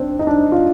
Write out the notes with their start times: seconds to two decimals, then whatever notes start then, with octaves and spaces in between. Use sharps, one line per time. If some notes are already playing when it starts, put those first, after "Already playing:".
Already playing: D#2 C4 D4
0.19 D#4
0.27 D4
0.52 F4